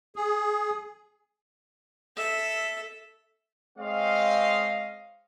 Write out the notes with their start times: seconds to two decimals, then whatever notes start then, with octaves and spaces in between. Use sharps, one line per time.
0.16 G#4
2.17 A4 E5
3.78 G#3 C4 C#5 D#5 F5